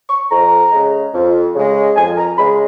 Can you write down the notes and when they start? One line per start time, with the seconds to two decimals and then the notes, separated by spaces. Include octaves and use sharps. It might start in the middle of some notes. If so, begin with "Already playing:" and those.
0.10 C#6
0.30 F2 A#5
0.72 C#3 G#3
1.14 F2
1.55 C#3 G#3
1.96 F2 G#5
2.17 A#5
2.38 C#3 G#3 B5